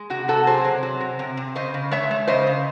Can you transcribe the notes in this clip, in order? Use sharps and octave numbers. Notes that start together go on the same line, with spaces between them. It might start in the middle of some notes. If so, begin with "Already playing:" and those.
Already playing: G#3
C3 F#4
C3 F#4 A4
F#3 G#4 C5
C3
F#3
C3
C3
C3
C#3 C5 D#5
C#3
G#3 C#5 E5
G#3
C#3 C5 D#5
C#3